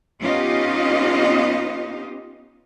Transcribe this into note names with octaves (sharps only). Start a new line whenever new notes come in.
B3 C#4 D#4 F4 G4 D#5